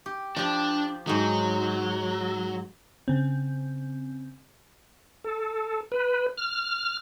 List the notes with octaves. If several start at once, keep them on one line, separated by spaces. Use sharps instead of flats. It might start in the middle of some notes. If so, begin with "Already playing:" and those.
G4
F3 D4 G4
G#2 F#3 D#4
C#3 C4
A4
B4
F6